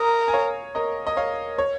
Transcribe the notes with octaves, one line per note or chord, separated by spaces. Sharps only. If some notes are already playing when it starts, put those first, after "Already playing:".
Already playing: A#4 A#5 D#6
G#5
C#5 F5
A#4 D#5
D#5
C#5 F5
C#5